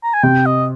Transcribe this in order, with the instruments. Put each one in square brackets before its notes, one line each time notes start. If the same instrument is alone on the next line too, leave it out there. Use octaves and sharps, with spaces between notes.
[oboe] A#5
G#5
[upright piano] C3 [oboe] G5
[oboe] D#5